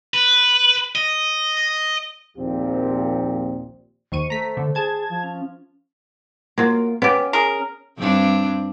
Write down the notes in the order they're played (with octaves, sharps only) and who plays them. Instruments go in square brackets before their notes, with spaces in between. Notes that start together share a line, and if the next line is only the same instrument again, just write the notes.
[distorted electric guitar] B4
D#5
[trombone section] A#1 D#2 A#2 F3 C4 G4
[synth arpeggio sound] D#2 C#6 D#7 [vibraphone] C5
[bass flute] A3 [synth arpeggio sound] A#5 B6
[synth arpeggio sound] D3
[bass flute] G#4 [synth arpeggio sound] A5 G#6
[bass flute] F3
[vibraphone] C#4
[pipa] F#3 F4 [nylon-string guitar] A#3
[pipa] B3 G4 [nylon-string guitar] C#4
[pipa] G#4 A#4
[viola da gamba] G2 C4 D4